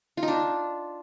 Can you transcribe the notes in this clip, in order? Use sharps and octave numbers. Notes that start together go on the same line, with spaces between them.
F4
D#4
D4